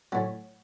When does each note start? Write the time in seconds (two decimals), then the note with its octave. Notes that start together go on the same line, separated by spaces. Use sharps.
0.12 A2 F#3 C#4